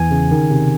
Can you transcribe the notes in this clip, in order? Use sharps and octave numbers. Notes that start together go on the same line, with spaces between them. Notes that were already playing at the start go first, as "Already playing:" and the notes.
Already playing: E2 E3 G#5
C#3
D#3
C3